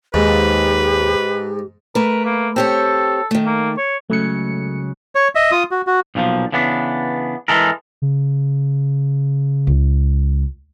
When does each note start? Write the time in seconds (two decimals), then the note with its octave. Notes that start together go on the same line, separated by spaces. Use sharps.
0.14 D#2 G#2 G4 B4
1.95 A3 A#4 B4
2.25 A#3
2.56 C4 G4 A4 C#5
3.31 D#3 A3
3.46 A#3
3.78 C#5
4.10 C#2 C#3 F#3 A3 C#7
5.15 C#5
5.35 D#5 E5
5.51 F4 D#6
5.71 F#4
5.87 F#4
6.15 B1 A#2 E3 F3
6.52 C#3 E3 B3 D4
7.48 E3 G#3 A4 A#4
8.02 C#3
9.67 C#2